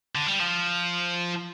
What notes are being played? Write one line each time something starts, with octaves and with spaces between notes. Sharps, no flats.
D3
G3
F3